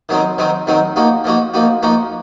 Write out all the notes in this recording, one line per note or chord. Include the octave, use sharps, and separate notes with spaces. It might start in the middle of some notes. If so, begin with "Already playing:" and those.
D#3 F#3 C4 D#4
D#3 F#3 C4 D#4
D#3 F#3 C4 D#4
F3 A#3 D#4 F#4
F3 A#3 D#4 F#4
F3 A#3 D#4 F#4
F3 A#3 D#4 F#4